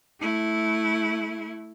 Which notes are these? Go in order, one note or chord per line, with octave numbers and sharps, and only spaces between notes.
A3 E4